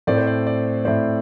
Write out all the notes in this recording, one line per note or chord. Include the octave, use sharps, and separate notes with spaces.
A2 A3 C4 D5
C5
D5
D5
A2 A3 C4 D5